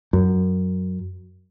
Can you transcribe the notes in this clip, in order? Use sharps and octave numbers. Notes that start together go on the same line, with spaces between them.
F#2